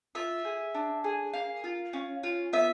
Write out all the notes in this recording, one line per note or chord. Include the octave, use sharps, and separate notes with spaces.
F4 E5
G#4
D4
G#4
A#3 F5
F4
C#4
F4
B3 E5